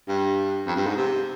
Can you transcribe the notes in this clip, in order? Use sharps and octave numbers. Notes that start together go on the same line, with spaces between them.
G2
F2
G2
G#2
C3